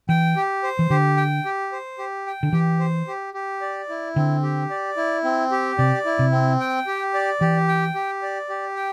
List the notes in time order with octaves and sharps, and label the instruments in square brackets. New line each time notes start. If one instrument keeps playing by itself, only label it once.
[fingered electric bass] E3 [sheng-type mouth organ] G5
[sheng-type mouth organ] G4
C5
[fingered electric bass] E3
[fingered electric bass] D3 [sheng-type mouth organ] G4
[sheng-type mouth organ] G5
G4
C5
G4
G5
[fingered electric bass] D3
[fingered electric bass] E3 [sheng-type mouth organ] G4
[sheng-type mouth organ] C5
G4
G4
D5
E4
[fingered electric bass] D3 [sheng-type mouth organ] C4
[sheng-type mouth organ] G4
D5
E4
C4
G4
[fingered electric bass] C3 [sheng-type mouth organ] D5
[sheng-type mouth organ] E4
[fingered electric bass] C3
[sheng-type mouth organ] C4
G5
G4
D5
[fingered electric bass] E3 [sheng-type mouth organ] G4
[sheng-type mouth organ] G5
G4
D5
G4
G5